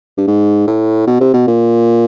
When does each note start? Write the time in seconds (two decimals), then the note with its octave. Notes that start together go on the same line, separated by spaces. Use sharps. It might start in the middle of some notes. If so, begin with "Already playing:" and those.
0.17 G2
0.27 G#2
0.67 A2
1.07 B2
1.20 C3
1.34 B2
1.47 A#2